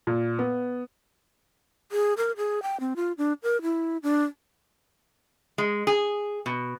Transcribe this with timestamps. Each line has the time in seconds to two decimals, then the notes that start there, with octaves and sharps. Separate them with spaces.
0.07 A#2
0.39 B3
1.92 G#4
2.17 A#4
2.37 G#4
2.63 G5
2.80 C4
2.96 F4
3.18 D4
3.43 A#4
3.62 E4
4.03 D4
5.58 G#3
5.87 G#4
6.46 B2